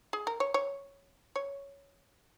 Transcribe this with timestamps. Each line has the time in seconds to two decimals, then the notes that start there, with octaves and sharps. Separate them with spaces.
0.13 G#4
0.27 A#4
0.40 C#5
0.54 C#5
1.36 C#5